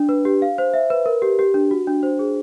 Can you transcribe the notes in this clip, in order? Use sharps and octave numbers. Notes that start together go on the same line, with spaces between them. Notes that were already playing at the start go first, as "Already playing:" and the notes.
Already playing: D4
B4
G4
F5
C5
E5
B4
A#4
G4
G4
D4
F#4
D4
C5
G#4